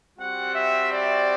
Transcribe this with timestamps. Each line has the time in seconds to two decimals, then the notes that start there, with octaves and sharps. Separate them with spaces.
0.18 G3 C4 F#4 F#5
0.54 E5
0.90 D5